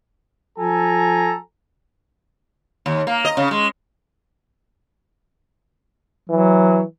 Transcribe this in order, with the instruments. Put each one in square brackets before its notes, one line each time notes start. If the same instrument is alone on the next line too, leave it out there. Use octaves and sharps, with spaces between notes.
[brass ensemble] F3 A4 G#5 A#5
[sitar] D#2
A#3
D#5
C#3
G#3
[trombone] E3 [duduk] F#3